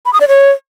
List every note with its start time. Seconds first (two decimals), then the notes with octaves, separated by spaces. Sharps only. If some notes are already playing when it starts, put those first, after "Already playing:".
0.06 B5
0.13 D#6
0.21 D5
0.28 C#5